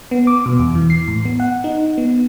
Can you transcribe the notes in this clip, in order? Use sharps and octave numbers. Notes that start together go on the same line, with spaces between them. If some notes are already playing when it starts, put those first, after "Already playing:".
B3
D6
B2
E2
E3
C7
A2
B3
F#5
D#4
B3